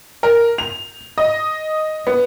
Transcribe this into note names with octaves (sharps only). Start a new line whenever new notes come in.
A#4
F7
D#5
B3